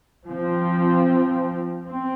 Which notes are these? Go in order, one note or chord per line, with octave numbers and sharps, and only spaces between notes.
F3 C4
C4